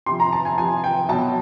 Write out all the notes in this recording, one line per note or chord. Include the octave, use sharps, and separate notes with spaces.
C3 F3 C6
A#5
A5
G#5
C3 F3 G#5
G5
B2 F#3 A5